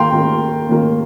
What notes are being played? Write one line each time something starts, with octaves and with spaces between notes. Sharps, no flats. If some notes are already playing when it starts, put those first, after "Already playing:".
Already playing: D#2 D#3 A#3 F4 F5 G5 A#5 C6
D#2 D#3 A#3
D#2 D#3 A#3